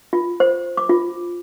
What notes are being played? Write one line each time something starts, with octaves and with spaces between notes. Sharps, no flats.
F4
C5
D6
F4